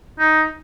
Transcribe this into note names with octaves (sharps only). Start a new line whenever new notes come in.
D#4